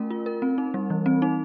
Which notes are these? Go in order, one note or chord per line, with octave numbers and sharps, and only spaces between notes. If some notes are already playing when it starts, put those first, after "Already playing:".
Already playing: A3 C#4 F4 A#4
F4
A#4
C4
D#4
G3
E3
C4
D#4